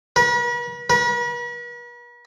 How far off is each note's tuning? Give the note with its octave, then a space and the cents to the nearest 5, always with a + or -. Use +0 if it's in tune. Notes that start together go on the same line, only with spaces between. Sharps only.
B4 -45
B4 -45